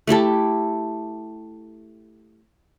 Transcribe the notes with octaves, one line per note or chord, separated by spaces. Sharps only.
A3 E4 G4 A4